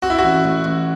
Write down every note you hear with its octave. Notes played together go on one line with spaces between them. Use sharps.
C4 F#4
E4
A1 F#4
A1
A1